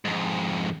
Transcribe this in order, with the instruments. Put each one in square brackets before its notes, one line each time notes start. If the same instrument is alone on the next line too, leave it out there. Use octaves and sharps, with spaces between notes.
[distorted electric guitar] F2 G#2